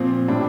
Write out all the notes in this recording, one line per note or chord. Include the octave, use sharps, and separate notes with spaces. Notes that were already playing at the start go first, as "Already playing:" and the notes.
Already playing: A#2 F3 C4
A2 G3 D4